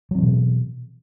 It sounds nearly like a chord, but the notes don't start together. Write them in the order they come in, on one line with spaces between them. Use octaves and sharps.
F#3 C4 E3 B2